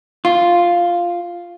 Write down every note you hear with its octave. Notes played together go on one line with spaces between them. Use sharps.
F4